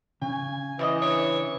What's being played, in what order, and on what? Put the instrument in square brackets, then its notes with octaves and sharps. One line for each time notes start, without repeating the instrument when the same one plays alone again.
[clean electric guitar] C#3 [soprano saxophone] G#5
[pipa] C3 F4 D#5 [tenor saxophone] E3
[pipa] D4 [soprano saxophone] C#5